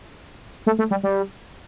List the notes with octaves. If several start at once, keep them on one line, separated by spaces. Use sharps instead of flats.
A3
A3
G3
G3